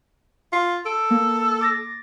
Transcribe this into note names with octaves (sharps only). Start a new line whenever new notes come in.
F4
A4 D7
A#3
D6 A6 A#6